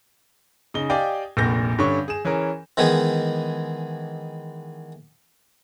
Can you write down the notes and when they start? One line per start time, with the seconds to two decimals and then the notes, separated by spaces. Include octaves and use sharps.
0.74 C#3 D#4 G7
0.90 G4 D5 D#5 F5 G5 G#5
1.37 F1 A#1 A#2 G6 A#6
1.78 G2 D3 C#4 C#6
2.08 G#4 E7
2.25 E3 C#4 G#4 A#4
2.77 D#3 E3 G#3 B3 G#4